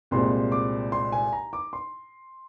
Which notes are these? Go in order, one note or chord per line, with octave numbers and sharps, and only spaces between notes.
C2 A#2 G#3 C4 C6
D6
C6
G#5
A#5
D6
C6